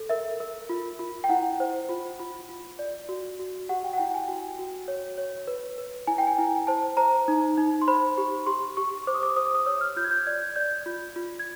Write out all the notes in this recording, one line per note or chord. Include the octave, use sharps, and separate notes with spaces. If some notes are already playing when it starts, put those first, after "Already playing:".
Already playing: A4
A#4 E5
A#4
F4
F4
G5
E4 F#5
C5
F4
F4
F4
D5
F#4
F#4
G4 F#5
G5
F#5
E4 G5
G#5
F#4 G5
F#4
C#5
C#5
B4
B4
E4 G#5
G5
G#5
E4
C5 A5
C5 A#5
D#4
D#4
C6
C5 B5
G4
G4 C6
G4 C#6
C5 D6
D#6
D6
C5 D#6
D6
D#6
C#5 E6
F6
F4 G6
G#6
G6
D5 G#6
D5 G6
F4
F4
G#6